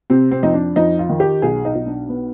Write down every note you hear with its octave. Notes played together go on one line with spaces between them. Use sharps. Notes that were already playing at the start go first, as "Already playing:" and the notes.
C3 C4
C4
F2 D#4
D4
F2 D#4
F4
D#3
G4
B1 G#4
D#4
B1
D4
B3